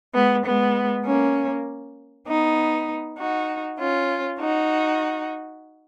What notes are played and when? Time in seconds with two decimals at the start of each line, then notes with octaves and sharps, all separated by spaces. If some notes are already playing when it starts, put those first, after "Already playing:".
0.14 G#3 B3
0.44 G#3 B3
1.05 A#3 C#4
2.26 B3 D#4
3.17 D#4 F#4
3.78 C#4 F4
4.39 D#4 F#4